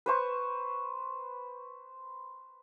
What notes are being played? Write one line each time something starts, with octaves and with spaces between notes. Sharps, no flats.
B4 C5 C#6